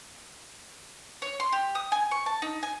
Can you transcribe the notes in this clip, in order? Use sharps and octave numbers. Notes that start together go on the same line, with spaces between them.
C#5
C6
G4
D#6
G#5
C#6
A5
D#4
G#5